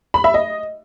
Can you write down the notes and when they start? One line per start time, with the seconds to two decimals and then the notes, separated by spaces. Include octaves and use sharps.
0.14 B5
0.24 E5
0.34 D#5